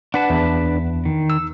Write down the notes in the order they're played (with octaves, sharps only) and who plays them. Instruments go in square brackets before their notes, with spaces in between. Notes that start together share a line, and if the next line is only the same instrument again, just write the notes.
[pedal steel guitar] D4 B4 A5 [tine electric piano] F#5
[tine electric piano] E2
[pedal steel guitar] D#3
[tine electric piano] E6